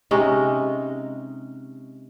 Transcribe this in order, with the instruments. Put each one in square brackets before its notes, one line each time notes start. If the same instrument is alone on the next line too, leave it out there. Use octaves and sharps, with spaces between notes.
[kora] C3 G#3 C#4 D#4